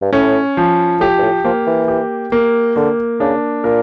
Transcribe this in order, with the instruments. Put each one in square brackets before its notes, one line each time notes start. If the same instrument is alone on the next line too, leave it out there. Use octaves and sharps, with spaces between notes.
[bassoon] G2
[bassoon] A2 [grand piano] C#4
[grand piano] F3
[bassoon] A2 [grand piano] G4
[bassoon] G2
A2
[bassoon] F3 [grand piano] A#3
[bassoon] E3
[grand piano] G4
A#3
[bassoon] D3 [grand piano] A#3
[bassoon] C#3 [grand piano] D4
[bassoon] A#2 [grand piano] A#4